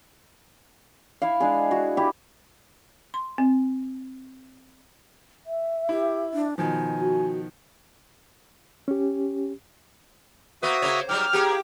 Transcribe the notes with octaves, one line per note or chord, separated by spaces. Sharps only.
E4 E5 F5
G#3 D4 G#4
F#4
E4 G4
C6
C4
E5
E4 G4
D4
B2 D#3 F3 G#5
F#4
C#4 G4
A#3 B3 F#4 C5 E5 D#6
C#3 A#3 C#5
G#2 F#3 G3 G5 D6 F6
A#3 G4 G#4